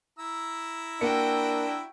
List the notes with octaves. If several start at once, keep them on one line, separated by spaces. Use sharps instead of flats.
E4 A#5 E6
A#3 D4 F#4 G5 C#7